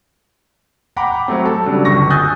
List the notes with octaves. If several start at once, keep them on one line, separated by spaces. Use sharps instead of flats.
F#5 G5 A#5 B5 D6
F#3 A3 C4
A4
C#3 F#3 G3 D4
G1 C#2 C#6 A#6
G#5 D#6 E6 F#6 G6 A6